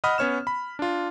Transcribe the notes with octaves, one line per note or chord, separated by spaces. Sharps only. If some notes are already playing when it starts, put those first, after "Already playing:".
D#5 F#5 B5 D#6 F6
B3 C#4 C#5 F6 E7
B5
D4 F4